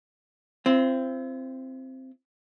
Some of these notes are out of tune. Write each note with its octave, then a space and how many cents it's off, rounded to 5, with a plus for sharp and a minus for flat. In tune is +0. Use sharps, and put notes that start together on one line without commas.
C4 +0 F4 -45